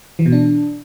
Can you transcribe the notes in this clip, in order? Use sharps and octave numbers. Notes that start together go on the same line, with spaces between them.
E3
B2
D4